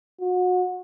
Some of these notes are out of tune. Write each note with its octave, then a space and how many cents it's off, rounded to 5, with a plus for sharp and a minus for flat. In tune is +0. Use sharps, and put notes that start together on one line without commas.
F#4 -30